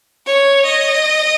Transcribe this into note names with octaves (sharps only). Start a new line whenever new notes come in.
C#5
D#5